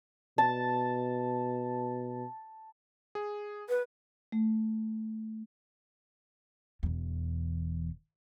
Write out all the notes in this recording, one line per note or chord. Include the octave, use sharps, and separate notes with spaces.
B2 A5
G#4
B4
A3
E1 E2